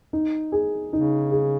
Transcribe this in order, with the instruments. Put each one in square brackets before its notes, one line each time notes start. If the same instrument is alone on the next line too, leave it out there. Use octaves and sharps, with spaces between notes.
[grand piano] D#4
G#4
[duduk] C#3 [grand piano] D#4
[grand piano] G#4